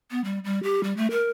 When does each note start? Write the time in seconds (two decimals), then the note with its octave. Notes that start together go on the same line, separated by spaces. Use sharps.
0.11 B3
0.24 G3
0.44 G3
0.63 G4
0.83 G3
0.97 A3
1.11 A#4